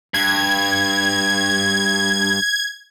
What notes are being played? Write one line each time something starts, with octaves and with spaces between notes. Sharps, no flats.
G2 G#6